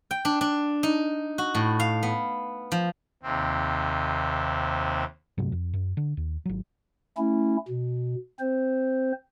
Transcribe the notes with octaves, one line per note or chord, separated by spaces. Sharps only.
G5
D4
D4
D#4
F#4
A2
F5
B3
F3
D#2 C3 C4
G2 C3 F#3 A3
F2
F#2
D3
D#2
G#1 F#3
A3 C#4 E4
B2
C4 C5